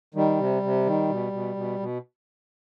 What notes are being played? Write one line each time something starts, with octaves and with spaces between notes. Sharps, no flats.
D#3 G3
C3
C3
D#3
B2
B2
B2
B2